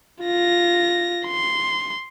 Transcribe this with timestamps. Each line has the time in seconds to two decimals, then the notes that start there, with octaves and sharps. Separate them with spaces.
0.22 F4 A#6
1.26 C6